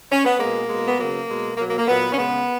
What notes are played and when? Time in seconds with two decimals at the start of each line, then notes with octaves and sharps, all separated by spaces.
0.11 C#4
0.24 B3
0.38 B2 G#3 A#3
0.68 B2 G#3
0.87 B3
0.98 C#3 F#3 A#3
1.27 B2 G#3
1.57 B2 F#3 A#3
1.68 A#3
1.78 A#3
1.87 A#2 F#3 B3
2.12 C#4
2.18 C#3 G#3 B3